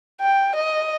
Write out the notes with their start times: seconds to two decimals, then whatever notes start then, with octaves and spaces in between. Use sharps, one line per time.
0.21 G5
0.56 D#5